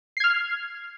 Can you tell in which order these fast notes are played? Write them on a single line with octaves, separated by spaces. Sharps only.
C7 G#6 F6